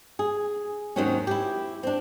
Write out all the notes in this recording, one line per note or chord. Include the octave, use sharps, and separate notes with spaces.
G#4
D#2 G#2 D#3 F#3 C4 C#4
E4 G4
C4 D4